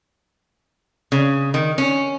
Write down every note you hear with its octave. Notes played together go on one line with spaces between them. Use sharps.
C#3
D#3
C#4